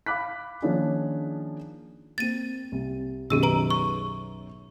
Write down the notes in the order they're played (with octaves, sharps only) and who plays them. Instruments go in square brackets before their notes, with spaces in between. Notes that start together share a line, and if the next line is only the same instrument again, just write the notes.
[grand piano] F5 B5 D6 F#6 B6
D#3 F3 A#3 C#4 D4 G#4
[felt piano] A#3 C4 [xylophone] A6 D#7
[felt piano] C2
[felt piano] B1 F#2 D#3 [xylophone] G4 G#4 E6
[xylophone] B4 A#5 D7
C#6